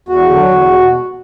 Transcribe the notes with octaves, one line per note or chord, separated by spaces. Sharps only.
E2 F#4
D3 F#3
E2
B2